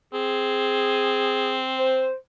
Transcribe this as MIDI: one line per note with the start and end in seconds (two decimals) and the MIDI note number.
0.13 2.09 60
0.13 1.60 68
1.79 2.14 72